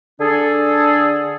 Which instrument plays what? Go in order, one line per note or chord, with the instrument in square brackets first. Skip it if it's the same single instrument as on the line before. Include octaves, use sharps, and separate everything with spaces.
[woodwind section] D3 D4 G#4 A4